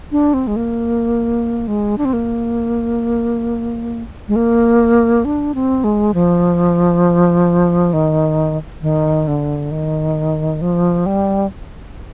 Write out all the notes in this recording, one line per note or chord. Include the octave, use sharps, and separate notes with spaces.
D4
C4
G#3
A#3
G#3
D4
C4
A#3
G#3
A#3
D4
C4
G#3
F3
D#3
D#3
D3
D#3
F3
G3